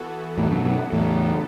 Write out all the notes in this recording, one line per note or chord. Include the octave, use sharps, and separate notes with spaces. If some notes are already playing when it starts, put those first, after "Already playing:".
Already playing: E3 B3 F#4 A4
E2 A2
F#2 B2
F#2 B2
E2 A2 C#3 F#3 B3 A4